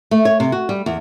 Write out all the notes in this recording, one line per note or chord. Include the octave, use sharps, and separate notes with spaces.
A3
C#5
C3
F#4
G3
E2